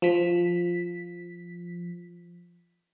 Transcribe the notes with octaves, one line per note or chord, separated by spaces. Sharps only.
F3 B6